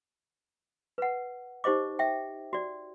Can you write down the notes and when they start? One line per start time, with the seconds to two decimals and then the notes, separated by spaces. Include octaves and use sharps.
0.98 B4 F#5
1.64 D#4 G4 C5 D#5 D6
1.99 E5 G5
2.53 F#4 D5